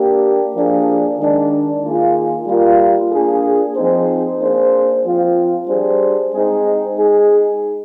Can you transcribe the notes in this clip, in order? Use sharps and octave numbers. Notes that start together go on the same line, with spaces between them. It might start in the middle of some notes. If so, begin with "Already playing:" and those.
Already playing: A#3 D4 G4
F3 A#3 D4 G#4
D#3 G#3 D4
D#3 A#3 F4 G#4
G3 A#3 F4 A#4
A#3 D4 F4 G#4
F3 C4 D#4 G#4 C5
A#3 D4 G#4 C5
F3 C4 F4
G3 D4 G#4 C5
G#3 C4 D#4 G#4 C5
G#3 D#4 G#4